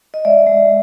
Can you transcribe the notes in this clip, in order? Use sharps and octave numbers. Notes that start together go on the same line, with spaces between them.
D#5
G#3 D5 E5
G#3